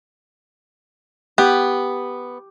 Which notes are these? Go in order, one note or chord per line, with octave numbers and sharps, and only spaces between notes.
B3 G4